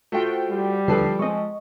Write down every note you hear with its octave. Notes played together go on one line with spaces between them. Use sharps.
A3 F4 F#4 C5 G5
G3
D#2 D3 E3 F3 A4 B4 C7
G#3 C4 D#5 C#6